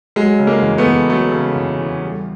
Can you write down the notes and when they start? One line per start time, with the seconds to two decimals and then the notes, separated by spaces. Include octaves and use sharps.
0.16 F#3 G#3
0.39 C#3
0.47 G#3 A#3
0.62 E2
0.78 A3 B3
0.86 E2
1.09 F#3 A3
1.32 C#3
1.56 E2
1.79 E2
2.03 G3